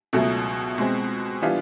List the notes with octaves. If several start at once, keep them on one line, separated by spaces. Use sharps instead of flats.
C#2 B2 F#3 A3
B2 G#3 C4
E3 G3 B3 D4 F4